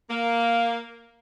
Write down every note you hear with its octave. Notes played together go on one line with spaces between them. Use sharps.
A#3